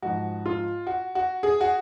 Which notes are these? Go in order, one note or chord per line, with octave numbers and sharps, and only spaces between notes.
G#2 F3 F#4
F4
F#4
F#4
G#4
F#4